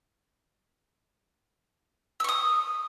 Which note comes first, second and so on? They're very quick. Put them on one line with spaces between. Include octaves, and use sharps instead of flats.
E6 C#6 D#6